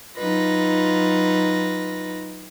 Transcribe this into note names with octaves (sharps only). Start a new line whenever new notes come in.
F#3 D#4 F4 B4 A#6